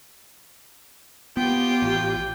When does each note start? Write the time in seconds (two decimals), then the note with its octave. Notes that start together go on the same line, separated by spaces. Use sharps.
1.37 B3 F4 G4 G5
1.82 A1